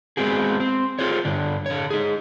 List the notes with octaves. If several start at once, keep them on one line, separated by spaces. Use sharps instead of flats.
G#3 B3 C4 F#4 G#4
C4
F4 G#4 C5 C#5
G2 D3 D4
D3 C#5
D#4 G#4